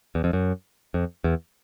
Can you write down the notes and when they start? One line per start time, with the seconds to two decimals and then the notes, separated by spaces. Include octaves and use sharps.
0.15 E2
0.24 F2
0.33 F#2
0.94 F2
1.24 E2